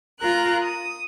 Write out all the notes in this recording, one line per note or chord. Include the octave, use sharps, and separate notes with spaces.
F4 A#4 A#5 F#6
D#6